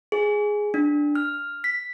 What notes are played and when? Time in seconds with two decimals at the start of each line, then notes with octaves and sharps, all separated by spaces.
0.12 G#4
0.74 D4
1.15 F6
1.64 B6